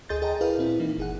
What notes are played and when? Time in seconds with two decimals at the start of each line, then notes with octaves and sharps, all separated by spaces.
0.09 D2 G#4 D#5 C6 G6 A6
0.22 G#4 D#5 G5 A5 A#5
0.41 E4 G#4 A#4 B4 D5 F5
0.58 A#2 C4 E4
0.79 E3 A#3 D#4
0.98 G1 G#4 F#5